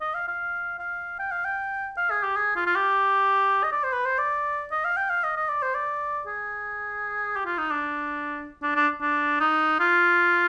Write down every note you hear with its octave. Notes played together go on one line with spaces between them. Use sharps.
D#5
F5
F5
F5
G5
F5
G5
F5
G#4
G4
G#4
F4
F4
G4
D#5
D5
C5
B4
C5
D5
D#5
F5
G5
F5
D#5
D#5
D5
C5
D5
G#4
G4
F4
D#4
D4
D4
D4
D4
D#4
F4